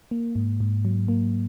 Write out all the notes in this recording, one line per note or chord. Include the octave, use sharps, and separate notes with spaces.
A#3
G#2
G#2
F#3
A#3